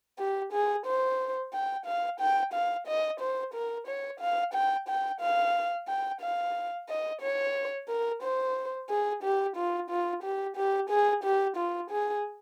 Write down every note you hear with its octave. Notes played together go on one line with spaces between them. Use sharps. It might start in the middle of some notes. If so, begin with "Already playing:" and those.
G4
G#4
C5
G5
F5
G5
F5
D#5
C5
A#4
C#5
F5
G5
G5
F5
G5
F5
D#5
C#5
A#4
C5
G#4
G4
F4
F4
G4
G4
G#4
G4
F4
G#4